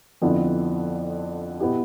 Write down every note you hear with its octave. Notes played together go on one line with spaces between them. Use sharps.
F2 D3 F3 B3 E4
B2 B3 E4 G4